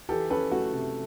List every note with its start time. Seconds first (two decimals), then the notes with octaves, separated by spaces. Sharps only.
0.09 E3 G4 A4
0.30 C#4 A4 B4
0.51 A3 F#4
0.73 C3